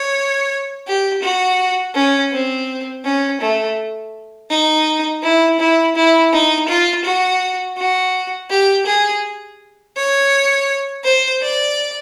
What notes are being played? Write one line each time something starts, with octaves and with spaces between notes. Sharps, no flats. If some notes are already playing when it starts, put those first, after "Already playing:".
Already playing: C#5
G4
F#4
C#4
C4
C#4
A3
D#4
E4
E4
E4
D#4
F4
F#4
F#4
G4
G#4
C#5
C5
D5